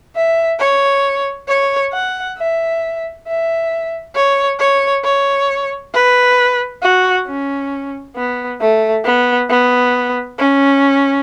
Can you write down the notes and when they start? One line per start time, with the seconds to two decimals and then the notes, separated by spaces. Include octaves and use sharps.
0.15 E5
0.60 C#5
1.48 C#5
1.93 F#5
2.37 E5
3.27 E5
4.15 C#5
4.60 C#5
5.04 C#5
5.94 B4
6.82 F#4
7.27 C#4
8.16 B3
8.60 A3
9.04 B3
9.50 B3
10.39 C#4